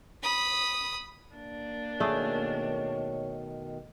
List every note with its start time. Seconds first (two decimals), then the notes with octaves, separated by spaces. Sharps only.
0.23 B5 D#6
1.33 A#3 D4
2.00 B2 D#3 A3 G#4 C#5